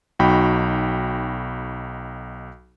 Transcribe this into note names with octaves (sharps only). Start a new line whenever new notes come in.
B1 D#4 F#4 G5 B5